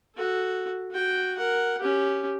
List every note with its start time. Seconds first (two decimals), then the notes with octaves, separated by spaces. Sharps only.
0.16 F#4 A4
0.91 F#4 G5
1.37 A#4 F#5
1.80 C#4 G4